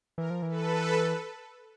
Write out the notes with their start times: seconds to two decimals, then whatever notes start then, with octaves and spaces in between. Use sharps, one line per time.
0.18 E3 A#4
0.30 F3
0.42 E3
0.49 A4 B4